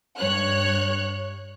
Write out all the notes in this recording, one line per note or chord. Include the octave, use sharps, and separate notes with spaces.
G2 C#5 F#6